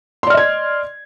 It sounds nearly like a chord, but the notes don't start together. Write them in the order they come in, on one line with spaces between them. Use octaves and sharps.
C6 D5 F6 D#5 G#6